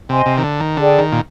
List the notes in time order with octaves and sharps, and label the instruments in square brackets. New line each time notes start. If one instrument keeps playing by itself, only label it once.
[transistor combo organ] C3 [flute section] C5 D#5 G#5 C6
[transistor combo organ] C3
D#3
D3
D#3
[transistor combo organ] D3 [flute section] D4 G#4 D5 G5
[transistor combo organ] D#3
A#2